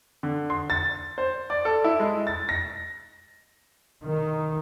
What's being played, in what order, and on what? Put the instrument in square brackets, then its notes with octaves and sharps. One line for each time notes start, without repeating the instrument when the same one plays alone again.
[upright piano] D3
C6
A6
C5
D5
A4
E4
G#3
A6
A#6
[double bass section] D#3